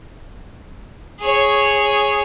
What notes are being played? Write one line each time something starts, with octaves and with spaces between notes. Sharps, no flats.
G#4 C#5